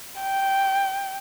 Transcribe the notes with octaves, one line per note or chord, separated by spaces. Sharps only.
G5